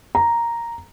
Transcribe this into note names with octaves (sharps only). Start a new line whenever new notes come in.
A#5